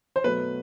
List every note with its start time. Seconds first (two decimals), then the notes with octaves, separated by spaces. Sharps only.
0.16 C5
0.24 B2 F#3 A3 B4